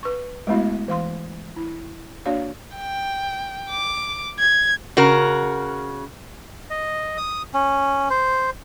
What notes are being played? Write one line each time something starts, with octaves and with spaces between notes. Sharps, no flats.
B4 C#6
G#3 A3 B3 E4 F#4
E3 F5 C6
E4
A#3 D4 F#4 C#5 D5 F5
G5
D6
G#6
C#3 F#4 A#4
D#5
D#6
C#4
C5